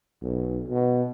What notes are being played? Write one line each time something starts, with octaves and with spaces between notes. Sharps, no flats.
B1
B2